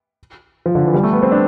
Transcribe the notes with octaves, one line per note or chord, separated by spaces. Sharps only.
F3
D3
E3
G3
A3
B3
C4
D4